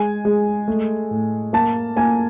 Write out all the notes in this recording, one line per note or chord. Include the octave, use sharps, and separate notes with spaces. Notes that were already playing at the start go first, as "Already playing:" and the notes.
Already playing: G#3 G#5
G#3
A3
A2
A#3 A5
A#3 G#5